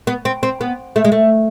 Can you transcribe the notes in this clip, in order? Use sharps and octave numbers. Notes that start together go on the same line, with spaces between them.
B3
C4
C4
B3
A3
G#3
A3